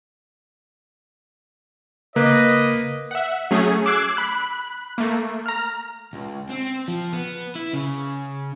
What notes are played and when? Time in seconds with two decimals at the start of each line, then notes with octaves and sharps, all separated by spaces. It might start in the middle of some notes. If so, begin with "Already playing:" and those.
2.16 C#3 A#3 A#4 B4 D#5 D6
3.11 E5 F#5
3.51 F#3 A3 C#4 G#4
3.86 D6 E6 F#6 G#6 C7
4.17 B5 F#6
4.98 A3 A#3
5.46 A#5 F6
6.14 C#2
6.50 C4
6.88 F3
7.13 B3
7.56 E4
7.73 C#3